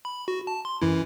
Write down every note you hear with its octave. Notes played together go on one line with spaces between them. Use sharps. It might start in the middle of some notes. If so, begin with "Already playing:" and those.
B5
F#4
A5
C6
F#2 E3 E4